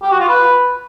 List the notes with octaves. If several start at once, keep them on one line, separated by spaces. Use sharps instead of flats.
G4
F#4
F4
B4